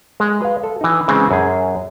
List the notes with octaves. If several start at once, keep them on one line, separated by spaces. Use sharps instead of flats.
G#3
B4 F5
A4
E3 D#4
C#3 E3 G#3 C4
F#2 G#4